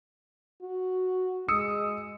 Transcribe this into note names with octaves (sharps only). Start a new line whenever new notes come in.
F#4
G#3 D#6 E6 C#7